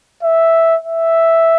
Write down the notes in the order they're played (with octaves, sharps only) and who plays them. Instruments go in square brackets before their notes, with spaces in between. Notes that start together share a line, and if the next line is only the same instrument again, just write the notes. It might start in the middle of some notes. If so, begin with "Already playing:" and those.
[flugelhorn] E5
E5